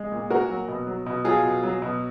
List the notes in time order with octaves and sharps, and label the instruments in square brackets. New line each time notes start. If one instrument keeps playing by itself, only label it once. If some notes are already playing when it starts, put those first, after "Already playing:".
Already playing: [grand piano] G#3
A#2
A#2 F#4 A#4
F#3
B2
F#3
B2
F#3 F4 G#4
B2
F#3
B2